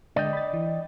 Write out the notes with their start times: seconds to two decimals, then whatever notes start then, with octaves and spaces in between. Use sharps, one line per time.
0.16 D3 G#3 D5 D#5 G5
0.33 B5 A6
0.53 E3